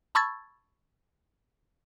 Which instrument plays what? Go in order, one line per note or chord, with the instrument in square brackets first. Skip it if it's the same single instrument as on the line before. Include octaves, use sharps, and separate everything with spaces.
[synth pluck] A5 B5 C#6 E6 G#6 A6